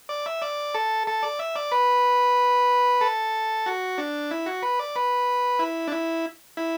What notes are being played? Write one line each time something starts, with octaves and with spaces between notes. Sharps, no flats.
D5
E5
D5
A4
A4
D5
E5
D5
B4
A4
F#4
D4
E4
F#4
B4
D5
B4
E4
D4
E4
E4